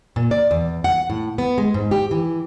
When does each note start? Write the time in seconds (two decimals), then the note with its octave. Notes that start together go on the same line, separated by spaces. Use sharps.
0.16 A#2
0.31 D5
0.51 E2
0.84 F#5
1.10 A2
1.38 B3
1.58 G#3
1.74 G#2
1.91 G4
2.11 E3